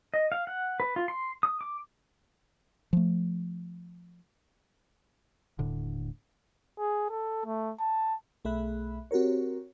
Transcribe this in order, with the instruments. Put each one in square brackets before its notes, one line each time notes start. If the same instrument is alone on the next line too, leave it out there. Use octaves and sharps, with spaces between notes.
[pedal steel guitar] D#5
F5
F#5
B4
F4
C6
D#6
D6
[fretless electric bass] F3 A3
[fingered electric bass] D#1 A2 D3
[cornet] G#4
A4
A3
A5
[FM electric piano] B1 A3 G#4 E5 B5 F#6
C4 F#4 G4 A#4 C#5